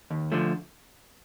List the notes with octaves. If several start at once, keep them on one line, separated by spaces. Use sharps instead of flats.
D#2
D3 F3 A3